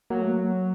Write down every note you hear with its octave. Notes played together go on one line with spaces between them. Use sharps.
F#3 A#3
A3
A#3